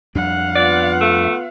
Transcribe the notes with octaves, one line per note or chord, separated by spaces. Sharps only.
F2 G3 D4 F5 F#5
B3 F4 D5
A3